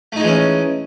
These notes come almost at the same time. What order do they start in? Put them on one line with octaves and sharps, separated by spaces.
A3 D#4 G#3 E3 C#4